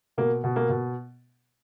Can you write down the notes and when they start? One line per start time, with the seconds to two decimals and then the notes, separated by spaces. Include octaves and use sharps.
0.17 B2 A#3
0.44 B2
0.56 A#3
0.69 B2